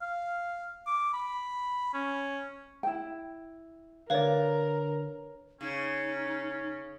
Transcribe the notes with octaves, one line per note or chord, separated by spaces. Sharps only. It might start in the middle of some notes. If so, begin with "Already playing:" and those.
F5
D6
B5
C#4
E4 G5
D3 A#4 B4 C#5 D5 F5
C#3 C#4 D#4